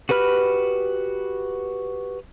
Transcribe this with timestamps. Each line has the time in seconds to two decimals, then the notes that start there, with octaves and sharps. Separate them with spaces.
0.09 F#4 G4 B4 B5 F6